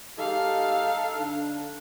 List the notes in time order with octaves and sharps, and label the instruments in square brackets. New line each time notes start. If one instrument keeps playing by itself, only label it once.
[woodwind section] G#3 G4 [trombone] D#4 [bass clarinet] A4 [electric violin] F5
[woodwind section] D3 D4